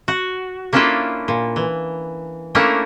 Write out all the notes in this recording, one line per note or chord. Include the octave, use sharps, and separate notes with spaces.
F#4
A#3 C#4 D4 E4 F4 A4
A#2
E3
A3 A#3 C#4 D4 E4 A#4